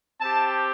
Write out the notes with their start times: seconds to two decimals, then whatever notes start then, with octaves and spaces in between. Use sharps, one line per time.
0.21 C4 G4 A5